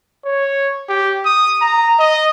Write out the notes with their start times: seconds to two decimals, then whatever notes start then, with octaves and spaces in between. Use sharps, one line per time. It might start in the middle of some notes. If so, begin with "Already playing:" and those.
0.25 C#5
0.89 G4
1.25 D#6
1.61 A#5
1.99 D#5